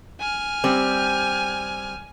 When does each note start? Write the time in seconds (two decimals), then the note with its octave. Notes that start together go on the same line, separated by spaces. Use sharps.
0.20 G#5 F6
0.64 G3 C4